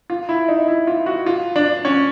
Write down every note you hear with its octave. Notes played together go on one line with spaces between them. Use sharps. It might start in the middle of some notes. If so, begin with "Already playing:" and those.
F4
E4
D#4
E4
F4
F#4
F4
D4
C#4